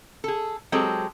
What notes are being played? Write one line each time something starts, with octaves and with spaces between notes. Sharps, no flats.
G#4 A4
F#3 G#3 C4 G4 A4